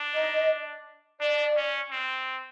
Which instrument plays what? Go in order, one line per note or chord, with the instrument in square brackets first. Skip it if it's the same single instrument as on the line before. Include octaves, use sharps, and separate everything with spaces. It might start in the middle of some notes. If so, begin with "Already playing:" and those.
Already playing: [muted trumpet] D4
[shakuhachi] D#5
[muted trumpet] D4 [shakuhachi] D5
[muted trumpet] C#4
C4